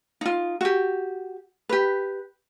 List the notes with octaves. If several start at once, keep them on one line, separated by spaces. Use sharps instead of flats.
D#4 F4
F#4 G4
G4 B4